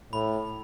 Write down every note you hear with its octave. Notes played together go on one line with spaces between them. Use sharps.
A2 B5